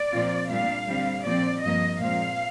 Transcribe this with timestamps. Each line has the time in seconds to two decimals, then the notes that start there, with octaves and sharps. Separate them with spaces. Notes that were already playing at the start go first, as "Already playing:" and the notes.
Already playing: D5
0.12 A#2 F3 C4 F4
0.50 A#2 G3 D4 F5
0.87 D3 G3 C4
1.25 A#2 F3 C4 D5
1.62 G2 F3 A#3 D#5
2.00 A#2 F3 G#3 C4 F5